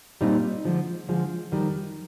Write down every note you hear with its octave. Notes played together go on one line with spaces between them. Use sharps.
A#2 G3 C4 D#4
D3 F3 G#3
D3 F3 G#3
F2 D#3 G3